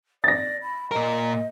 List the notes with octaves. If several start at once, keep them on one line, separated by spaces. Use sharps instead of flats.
D5 A6 A#6
B5
A#2 A#4 D#5